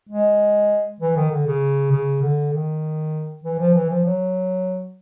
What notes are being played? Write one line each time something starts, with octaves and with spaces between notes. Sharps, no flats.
G#3
E3
D#3
D3
C#3
C#3
D3
D#3
E3
F3
E3
F3
F#3